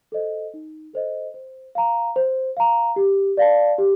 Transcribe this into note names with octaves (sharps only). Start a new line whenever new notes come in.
A4 C5 D#5
D#4
A4 C5 D#5
C5
F5 A#5
C5
F5 A#5
G4
D5 F5 A5
G4